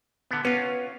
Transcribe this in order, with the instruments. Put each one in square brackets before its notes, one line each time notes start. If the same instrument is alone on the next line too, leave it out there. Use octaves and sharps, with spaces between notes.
[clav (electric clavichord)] D3 B3
[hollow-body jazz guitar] B3 [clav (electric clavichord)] C#4 F4